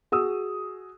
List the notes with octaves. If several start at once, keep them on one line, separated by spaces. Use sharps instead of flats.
F#4 G#4 D#6 E6